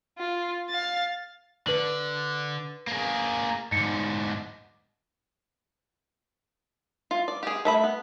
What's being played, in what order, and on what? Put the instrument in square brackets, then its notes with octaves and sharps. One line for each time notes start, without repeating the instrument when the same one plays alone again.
[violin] F4
F5 A6
[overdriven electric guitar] D3 [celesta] B4 F#7
[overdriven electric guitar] A#3 G#4
[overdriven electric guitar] G#2 D3 [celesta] C#7
[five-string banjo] F4
D5
G4 G#4
A3 E5 B5
B3